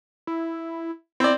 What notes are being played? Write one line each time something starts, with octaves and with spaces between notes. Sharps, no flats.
E4
C4 E4 D5